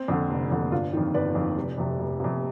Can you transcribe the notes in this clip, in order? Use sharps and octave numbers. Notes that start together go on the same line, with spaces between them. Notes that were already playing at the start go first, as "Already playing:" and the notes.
Already playing: C4
F2 D3
F1
F2 D3
G1 D4 F4
F2 D#3
G1 B4 D5
F2 D#3
F1
F2 C3
F1
F2 C3